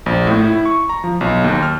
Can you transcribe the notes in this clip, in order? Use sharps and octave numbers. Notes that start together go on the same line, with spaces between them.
A#1
A2
E4
C#6
A#5
F3
B1
D#2
F6